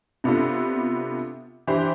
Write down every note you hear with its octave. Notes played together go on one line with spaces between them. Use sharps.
C3 B3 D4 F4 A4
E3 D4 G4 C5